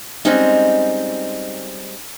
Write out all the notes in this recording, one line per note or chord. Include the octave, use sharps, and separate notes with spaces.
G3 G#3 C4 C#4 D#4